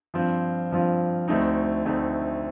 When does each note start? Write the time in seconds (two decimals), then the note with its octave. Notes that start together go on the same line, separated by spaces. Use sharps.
0.14 G2 F3 C4 F4
0.71 G2 F3 C4 F4
1.28 D2 D3 A3 C4 D#4
1.85 D2 D3 A3 C4 D#4